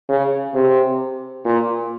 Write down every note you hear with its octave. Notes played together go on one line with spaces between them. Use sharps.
C#3
C3
A#2